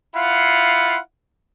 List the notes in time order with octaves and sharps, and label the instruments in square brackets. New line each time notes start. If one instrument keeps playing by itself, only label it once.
[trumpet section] E4 F4 F5 F#5